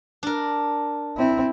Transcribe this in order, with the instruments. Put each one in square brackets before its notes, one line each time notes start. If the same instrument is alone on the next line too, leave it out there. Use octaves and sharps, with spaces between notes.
[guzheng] D4 A#4
[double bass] C4 E4